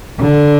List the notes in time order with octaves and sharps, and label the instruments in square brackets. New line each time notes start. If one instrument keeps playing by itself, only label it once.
[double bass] D3